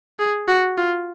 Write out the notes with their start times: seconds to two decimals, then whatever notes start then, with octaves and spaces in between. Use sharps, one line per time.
0.19 G#4
0.48 F#4
0.78 F4